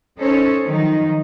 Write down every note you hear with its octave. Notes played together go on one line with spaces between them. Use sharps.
C#4 D#4 A4 C5 C#5
D#3 F3 F#3 D#4